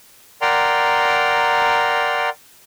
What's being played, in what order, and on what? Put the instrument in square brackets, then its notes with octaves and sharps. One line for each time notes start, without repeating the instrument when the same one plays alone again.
[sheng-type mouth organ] A#4 D5 F#5 G5 A#5 C6